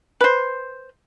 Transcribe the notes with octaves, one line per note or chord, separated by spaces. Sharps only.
B4 C5